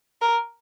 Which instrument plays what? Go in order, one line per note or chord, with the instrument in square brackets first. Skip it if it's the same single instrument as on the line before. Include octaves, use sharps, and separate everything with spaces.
[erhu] A#4